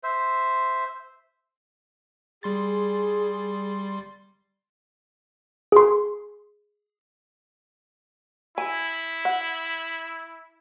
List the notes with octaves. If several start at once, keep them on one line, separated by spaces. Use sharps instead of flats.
C5 E5
G3 G#4 C6 A6
G#4 C6
E4 G#5
F#5